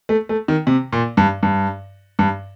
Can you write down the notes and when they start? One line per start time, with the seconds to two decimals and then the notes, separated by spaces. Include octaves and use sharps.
0.09 A3
0.29 A3
0.48 D#3
0.67 C3
0.93 A#2
1.17 G2
1.43 G2
2.19 G2